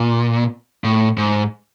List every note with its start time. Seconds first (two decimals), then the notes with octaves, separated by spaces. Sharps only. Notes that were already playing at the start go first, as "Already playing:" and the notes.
Already playing: A#2
0.84 A2
1.18 G#2